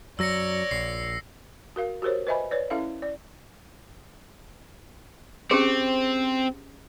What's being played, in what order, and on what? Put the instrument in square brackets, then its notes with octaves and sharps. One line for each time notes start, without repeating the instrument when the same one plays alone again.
[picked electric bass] F#2 F#3 [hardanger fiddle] C#5 D5 [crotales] E6 A#6 C#7
[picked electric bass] A#1 [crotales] C7
[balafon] F#4 A#4 F5
F#4 G4 A#4 C5 C#5
B4 C5 D#5 E5 G#5 B5
B4 C#5 D5
C#4 E4 A4 E5 F5
D5
[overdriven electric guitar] C4 [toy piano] C#4 G4 G#4